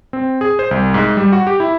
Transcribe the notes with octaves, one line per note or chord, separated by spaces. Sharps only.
C4
G#4
C5
C2
G#2
G3
F#4
G4
E4